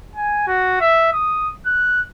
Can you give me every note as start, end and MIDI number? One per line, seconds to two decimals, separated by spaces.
0.16 0.47 80
0.47 0.78 66
0.81 1.11 76
1.12 1.49 87
1.66 2.02 90